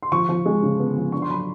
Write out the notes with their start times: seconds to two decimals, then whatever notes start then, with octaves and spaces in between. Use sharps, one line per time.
0.03 C6
0.12 F3 C#6
0.29 F3
0.45 G#3
0.62 C#3
0.80 B3
0.96 F3
1.12 D4 C#6
1.22 C6
1.30 F#3 B5